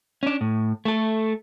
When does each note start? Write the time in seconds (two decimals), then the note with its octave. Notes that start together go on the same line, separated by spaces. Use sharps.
0.23 C#4 D4
0.41 A2
0.85 A3 A4